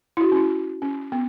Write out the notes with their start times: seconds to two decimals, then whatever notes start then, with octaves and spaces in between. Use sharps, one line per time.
0.17 E4
0.21 F#4
0.32 C#4
0.36 E4
0.82 C#4
1.12 B3